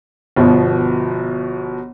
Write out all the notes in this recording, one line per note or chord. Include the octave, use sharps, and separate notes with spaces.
G1 B2 F3